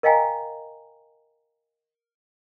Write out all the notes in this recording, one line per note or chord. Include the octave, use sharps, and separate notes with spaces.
A#4 D#5 F5 G5 G#5 A#5